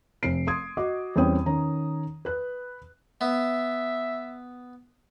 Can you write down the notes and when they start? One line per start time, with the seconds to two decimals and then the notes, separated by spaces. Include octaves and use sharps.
0.23 F1 C7 D7
0.47 C6 D#6 G#6
0.77 F#4 D#5 D6
1.16 E2 G3 C4 C#4 G5 D#6
1.46 D#3 C#4 A#5
2.25 B4 F#6
3.21 B3 E5